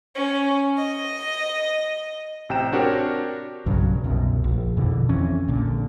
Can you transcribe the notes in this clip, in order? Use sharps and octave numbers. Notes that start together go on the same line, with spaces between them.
C#4
D#5
A1 C3 G5 A#5 E7
C4 D4 F#4 G4 A#4 C#5
B1 G2 C#3 F#3
C2 F#2 B2
A#1
F2 B2 D3 E3
F2 E3 C4 C#4
A#1 A#2 D3